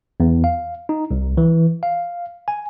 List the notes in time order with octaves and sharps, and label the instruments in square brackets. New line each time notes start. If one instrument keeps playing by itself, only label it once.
[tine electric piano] E2
F5
D#4
C2
E3
F5
G#5